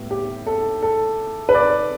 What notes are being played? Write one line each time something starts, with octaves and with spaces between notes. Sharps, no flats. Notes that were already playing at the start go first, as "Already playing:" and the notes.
Already playing: A2 G3 B3
G4
A4
A4
B4
D5